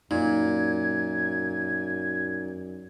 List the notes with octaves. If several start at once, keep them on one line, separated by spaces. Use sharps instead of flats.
F#2 A#2 D#4 G#6